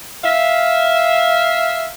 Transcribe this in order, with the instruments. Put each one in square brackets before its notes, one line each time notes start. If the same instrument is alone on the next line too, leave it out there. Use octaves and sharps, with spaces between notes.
[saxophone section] E5 F5